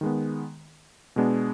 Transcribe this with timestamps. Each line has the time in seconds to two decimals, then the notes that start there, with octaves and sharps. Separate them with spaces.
0.01 D#3 G#3 B3
1.16 B2 G#3 B3 D4